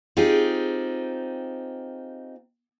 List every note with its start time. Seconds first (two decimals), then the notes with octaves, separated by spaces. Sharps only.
0.17 C4 D#4 F4 G4 G#4